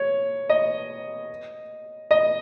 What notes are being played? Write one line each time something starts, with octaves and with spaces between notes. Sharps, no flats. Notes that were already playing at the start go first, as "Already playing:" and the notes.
Already playing: C#5
D#5
D#5